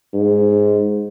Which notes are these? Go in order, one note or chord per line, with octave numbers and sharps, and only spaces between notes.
G#2